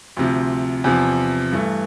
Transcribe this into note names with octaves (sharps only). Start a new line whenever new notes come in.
D2 C3 F3
E2 C3 F3
G2 E3 A3